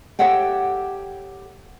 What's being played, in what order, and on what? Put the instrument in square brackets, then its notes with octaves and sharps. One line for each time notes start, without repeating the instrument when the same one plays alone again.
[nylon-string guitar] G4 A4 C#5 E5 F#5 G5